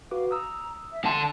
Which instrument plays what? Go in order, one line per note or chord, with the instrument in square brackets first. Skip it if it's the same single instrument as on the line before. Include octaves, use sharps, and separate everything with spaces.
[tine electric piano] F#4 B4 D6 [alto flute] F5
[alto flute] A#5 [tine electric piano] D#6 E6
[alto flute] E5
[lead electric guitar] D3 A5 [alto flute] C6